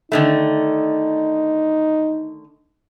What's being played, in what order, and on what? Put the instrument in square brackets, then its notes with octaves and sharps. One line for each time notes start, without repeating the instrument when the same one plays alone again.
[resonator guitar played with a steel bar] D3 D#3 A3 [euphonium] D#4